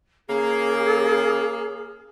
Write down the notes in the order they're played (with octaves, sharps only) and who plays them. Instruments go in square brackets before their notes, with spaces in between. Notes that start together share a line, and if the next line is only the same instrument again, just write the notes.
[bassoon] C#3 [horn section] A#3 [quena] G#4